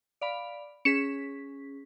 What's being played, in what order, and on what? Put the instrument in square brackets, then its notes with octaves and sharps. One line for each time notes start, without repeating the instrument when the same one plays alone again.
[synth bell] D5 F5 B5
[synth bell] C#4 G#4 B6 [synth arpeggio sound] C#7 E7